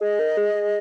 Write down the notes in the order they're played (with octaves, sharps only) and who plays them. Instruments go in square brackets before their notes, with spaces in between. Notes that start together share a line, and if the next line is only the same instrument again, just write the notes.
[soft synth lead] G#4 [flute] D#5
[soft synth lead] A#4
G#4
G#4